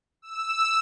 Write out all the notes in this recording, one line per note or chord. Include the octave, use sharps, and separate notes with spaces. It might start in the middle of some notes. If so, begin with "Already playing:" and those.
E6